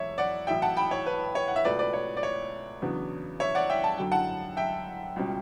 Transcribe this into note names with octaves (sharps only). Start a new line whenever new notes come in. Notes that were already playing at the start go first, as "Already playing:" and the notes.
Already playing: E1 E2 C#5 E5
D5 F#5
A1 A2 F#3 E5 G5
F#5 A5
G5 B5
C#5
B4
C#5
F#5
E5
C#2 B2 A3 B4 D5
B4 D5
C#5
D5
C#5
E2 C#3 F#3 B3 D4
C#5 E5
D5 F#5
E5 G5
A5
F#2 D3 F#3 G5
F#5 A5
E5 G5
C#2 B2 G3 C#4